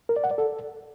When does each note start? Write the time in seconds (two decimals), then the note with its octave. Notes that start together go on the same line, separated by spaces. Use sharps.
0.09 A#4
0.16 D5
0.24 F#5
0.31 D5
0.38 A4